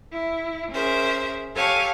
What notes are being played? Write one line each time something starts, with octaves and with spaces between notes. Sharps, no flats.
E4
C#4 G#4 A#4 C5 E5
G4 A4 C#5 F5 G#5 A5